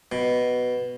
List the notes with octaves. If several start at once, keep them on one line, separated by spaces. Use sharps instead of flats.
B2